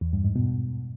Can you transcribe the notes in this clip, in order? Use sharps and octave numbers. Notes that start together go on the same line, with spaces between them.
E2
G2
G#2
B2